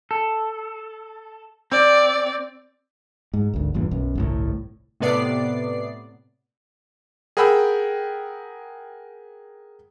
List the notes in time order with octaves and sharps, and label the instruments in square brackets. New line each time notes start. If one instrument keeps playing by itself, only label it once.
[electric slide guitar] A4
[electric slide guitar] C4 [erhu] D5
[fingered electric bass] G#2
G#1 D2
A1 E2 G2 A#2
B1 F#2
G1 C2 A2
[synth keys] A2 C3 B3 D5 C7
[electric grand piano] G#4 A#4 F#5 G5 B5 E6